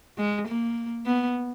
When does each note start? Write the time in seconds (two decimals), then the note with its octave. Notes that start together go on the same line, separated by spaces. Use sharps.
0.18 G#3
0.48 A#3
1.06 B3